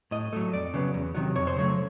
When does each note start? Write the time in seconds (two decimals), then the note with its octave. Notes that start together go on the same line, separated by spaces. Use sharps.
0.11 A2 D#5
0.33 F#3 A3
0.53 F2 D5
0.74 C#3 F#3 B3
0.94 E2
1.15 C3 D#3 F#3
1.35 F2 C#5
1.47 C5
1.56 C#3 F#3 A3 C#5